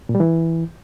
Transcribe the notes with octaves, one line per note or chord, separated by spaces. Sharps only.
A#2
G3
E3